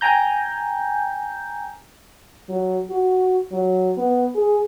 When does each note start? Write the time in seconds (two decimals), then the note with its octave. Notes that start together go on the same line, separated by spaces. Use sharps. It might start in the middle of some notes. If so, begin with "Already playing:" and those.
0.01 G5 G#5 A#5 G6
2.49 F#3
2.90 F#4
3.52 F#3
3.97 B3
4.35 G#4